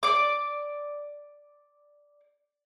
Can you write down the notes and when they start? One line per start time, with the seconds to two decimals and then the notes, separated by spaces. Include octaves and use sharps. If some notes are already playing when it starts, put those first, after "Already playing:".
0.03 D5 D6